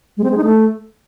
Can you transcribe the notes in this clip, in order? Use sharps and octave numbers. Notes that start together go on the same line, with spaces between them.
G#3
C4
G#3
D#4
A3